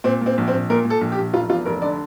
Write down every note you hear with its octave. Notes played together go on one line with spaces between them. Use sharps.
A#2 C4
A#2 C4
A#1
C4
A#1
A#2 A#4
A#2
A4
A#1
G4
A#1
F1 F4
E2 F4
F1 A#4
D3 D5